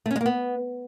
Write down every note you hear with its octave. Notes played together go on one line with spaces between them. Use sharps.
A3
C#4
G#3
A#3
B3